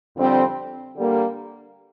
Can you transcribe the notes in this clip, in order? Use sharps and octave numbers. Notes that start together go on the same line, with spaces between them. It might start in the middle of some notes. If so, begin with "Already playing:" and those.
F2 D3 G3 C4
D3 G3 A#3